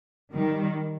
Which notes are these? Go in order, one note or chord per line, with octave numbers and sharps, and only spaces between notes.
D#3 G3